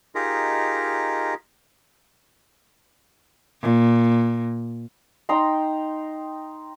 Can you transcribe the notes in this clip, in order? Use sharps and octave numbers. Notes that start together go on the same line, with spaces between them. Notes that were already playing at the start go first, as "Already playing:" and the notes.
D#4 F4 G4 G#4 A#4 D#5
A#2
D#4 G5 A#5 C6